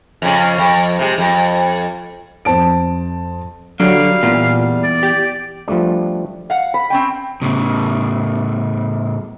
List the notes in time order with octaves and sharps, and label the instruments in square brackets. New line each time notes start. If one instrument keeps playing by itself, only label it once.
[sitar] F2 C#3
F2
C3 G#3
F2
[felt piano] F2 C5 A5 D7
[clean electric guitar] D3 [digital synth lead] F#3 [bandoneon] G3 [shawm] F5
[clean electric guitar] E2 [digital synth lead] A#2
[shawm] D5
[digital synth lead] G4
[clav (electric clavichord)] F3 G3 A3 D4
[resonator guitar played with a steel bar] F5 F#5
[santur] B5
[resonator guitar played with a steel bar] C4 C#4 G5
[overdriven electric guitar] A2 C#3